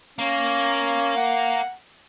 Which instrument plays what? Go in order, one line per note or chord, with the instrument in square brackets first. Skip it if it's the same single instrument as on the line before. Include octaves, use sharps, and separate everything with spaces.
[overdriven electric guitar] A#3 [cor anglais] C#4
[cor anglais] F#5